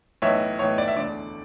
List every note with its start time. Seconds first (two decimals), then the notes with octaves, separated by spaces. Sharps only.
0.22 B1 A2 E3 C#5 E5
0.59 B1 A2 E3 C#5
0.78 D5
0.88 E5
0.96 E1 D2 D3 D5